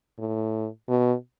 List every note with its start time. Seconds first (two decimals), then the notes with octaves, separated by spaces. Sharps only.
0.18 A2
0.89 B2